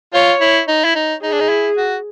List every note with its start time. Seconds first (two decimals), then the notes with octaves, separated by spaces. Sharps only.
0.13 F4 C#5
0.41 E4
0.68 D#4
0.84 E4
0.95 D#4
1.23 D#4 G#4
1.32 D4
1.40 D#4
1.49 E4
1.77 F#4